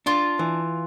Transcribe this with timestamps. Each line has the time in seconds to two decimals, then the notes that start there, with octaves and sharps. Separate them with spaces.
0.06 D4 F4
0.39 E3